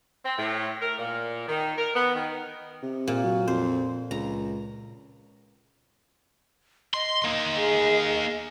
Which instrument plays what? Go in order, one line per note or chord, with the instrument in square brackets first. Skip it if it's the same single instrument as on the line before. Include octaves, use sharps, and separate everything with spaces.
[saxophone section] C4
A2
A#4
A#2
D#3
A#4
B3
D#3
[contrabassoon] C3
[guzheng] A#2
[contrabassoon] F#3
[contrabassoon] F2 [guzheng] C5
[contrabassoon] C#2 [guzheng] A#5
[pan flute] D#5 [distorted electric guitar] C6
[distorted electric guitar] A#3 D#4
[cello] G#4